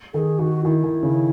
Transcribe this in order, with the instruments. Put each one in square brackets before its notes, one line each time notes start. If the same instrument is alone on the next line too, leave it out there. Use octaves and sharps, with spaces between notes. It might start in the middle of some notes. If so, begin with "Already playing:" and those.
[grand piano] D#3 [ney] G#4 A4
[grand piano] D#3 [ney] F#4
[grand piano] D#3 [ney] E4
[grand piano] D#3
C#3